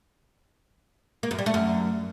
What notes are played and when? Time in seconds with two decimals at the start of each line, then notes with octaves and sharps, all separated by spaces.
1.23 A#3
1.31 F#2
1.39 G3
1.46 A3
1.54 F#2